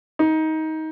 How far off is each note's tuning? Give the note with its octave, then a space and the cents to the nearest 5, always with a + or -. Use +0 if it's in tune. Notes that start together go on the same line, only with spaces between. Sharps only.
D#4 +20